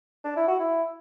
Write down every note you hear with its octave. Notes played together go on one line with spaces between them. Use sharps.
D4
E4
F#4
E4